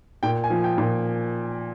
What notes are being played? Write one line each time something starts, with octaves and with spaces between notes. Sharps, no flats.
A#2 G5
G#5
F3
G5
A#2